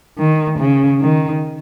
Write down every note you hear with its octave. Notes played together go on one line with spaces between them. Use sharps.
D#3
C#3
D#3